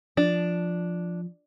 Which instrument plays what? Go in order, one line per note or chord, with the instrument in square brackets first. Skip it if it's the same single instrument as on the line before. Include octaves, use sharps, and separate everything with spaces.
[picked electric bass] F3 [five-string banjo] D4